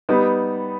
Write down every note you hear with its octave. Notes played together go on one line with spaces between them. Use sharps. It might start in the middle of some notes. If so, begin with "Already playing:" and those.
G3 B3 D#4